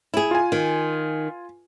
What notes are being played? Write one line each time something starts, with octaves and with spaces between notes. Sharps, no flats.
E4 G#4
F4 G#5
D#3